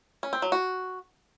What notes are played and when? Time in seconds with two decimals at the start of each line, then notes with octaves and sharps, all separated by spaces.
0.23 C#4
0.33 C4
0.42 F#3
0.52 F#4